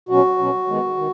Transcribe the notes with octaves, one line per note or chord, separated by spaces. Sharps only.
B2 F#3 C#4 F#4
B2 F#3 C#4
D#3 G#3 B3
D#3